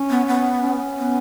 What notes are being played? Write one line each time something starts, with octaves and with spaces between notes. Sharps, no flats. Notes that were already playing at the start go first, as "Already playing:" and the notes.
Already playing: C#4
B3
B3
C#4
B3